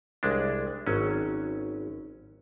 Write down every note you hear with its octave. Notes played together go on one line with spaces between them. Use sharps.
C2 G#3 D4
G#1 F#3 C#4